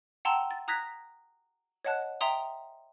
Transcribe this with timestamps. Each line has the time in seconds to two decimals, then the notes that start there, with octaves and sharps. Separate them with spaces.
0.25 F#5 G5 A5 A#5 C6 E6
0.51 A6
0.68 A#5 D#6 F#6 G#6 A#6 B6
1.85 C#5 D#5 F#5 A5 F#6
2.21 E5 G5 A#5 C6 D#6